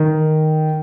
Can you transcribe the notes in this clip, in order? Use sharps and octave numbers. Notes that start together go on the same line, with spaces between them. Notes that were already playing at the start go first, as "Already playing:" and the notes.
Already playing: D#3